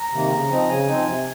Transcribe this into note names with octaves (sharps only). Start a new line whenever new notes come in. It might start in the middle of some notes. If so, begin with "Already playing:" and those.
Already playing: A#5
C3 D#3 A#3
C#3
F3 C4 D#4
C#3 G#5
F3 C4 D#4
C3